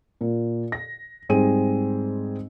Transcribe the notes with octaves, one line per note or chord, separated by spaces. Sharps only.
A#2
A#6
G#2 G3 C4 G#4 D#7